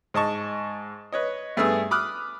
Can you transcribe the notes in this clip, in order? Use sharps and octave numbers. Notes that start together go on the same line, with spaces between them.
G#2 D#5 A5 C#6
B4 C#5 D#5
G2 A3 B3 G#4 E6
B5 D6 D#6 F6 F#6